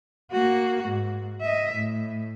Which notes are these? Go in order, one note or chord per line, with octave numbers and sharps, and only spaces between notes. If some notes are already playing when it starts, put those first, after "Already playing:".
A#3 F#4
G#2
D#5 E5
A2